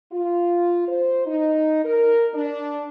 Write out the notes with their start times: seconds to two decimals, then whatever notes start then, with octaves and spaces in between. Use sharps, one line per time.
0.12 F4
0.88 C5
1.26 D#4
1.85 A#4
2.33 D4